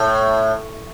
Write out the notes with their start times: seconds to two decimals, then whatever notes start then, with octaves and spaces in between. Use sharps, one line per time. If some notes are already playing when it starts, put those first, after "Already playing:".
Already playing: A2